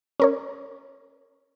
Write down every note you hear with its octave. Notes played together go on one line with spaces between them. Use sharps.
C#4 A#4 C#5